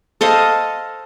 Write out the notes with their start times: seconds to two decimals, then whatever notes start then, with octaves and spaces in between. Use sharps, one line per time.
0.21 A4 C5 D#5 F5